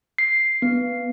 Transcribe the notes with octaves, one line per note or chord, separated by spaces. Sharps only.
C7
B3